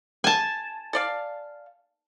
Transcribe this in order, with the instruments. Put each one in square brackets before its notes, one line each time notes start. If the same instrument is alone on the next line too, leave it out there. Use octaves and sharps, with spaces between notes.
[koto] G#5 A5
[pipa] A4 D5 F5